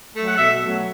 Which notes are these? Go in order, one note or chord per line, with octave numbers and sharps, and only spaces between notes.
F#3 A3
F#5
B2 E5
F#3 A3